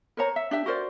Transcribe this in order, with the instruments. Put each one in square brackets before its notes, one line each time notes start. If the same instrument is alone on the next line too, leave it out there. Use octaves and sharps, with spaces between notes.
[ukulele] A#4 C5 C#5 A#5
E5
D4 G4 E5
F#4 A#4 C5 D5